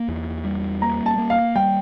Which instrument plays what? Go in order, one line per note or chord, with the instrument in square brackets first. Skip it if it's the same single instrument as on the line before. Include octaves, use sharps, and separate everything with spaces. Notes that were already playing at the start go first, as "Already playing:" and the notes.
Already playing: [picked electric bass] A#3
E2
G3
[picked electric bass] A#3 [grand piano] A#5
[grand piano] A5
[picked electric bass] A#3
[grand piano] F5
[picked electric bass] G3 [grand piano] G5